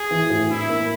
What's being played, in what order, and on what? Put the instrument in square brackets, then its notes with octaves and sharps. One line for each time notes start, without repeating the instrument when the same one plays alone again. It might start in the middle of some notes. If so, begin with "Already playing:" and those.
Already playing: [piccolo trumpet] G#4
[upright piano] E3
A2
[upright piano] D4 [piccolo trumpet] E4
[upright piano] A#3